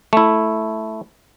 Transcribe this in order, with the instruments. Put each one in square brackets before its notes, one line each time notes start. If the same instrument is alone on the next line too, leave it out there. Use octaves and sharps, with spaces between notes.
[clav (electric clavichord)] A3 E4